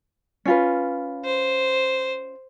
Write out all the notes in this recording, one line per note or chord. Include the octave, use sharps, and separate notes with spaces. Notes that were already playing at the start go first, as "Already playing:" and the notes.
C#4 F4 B4
C5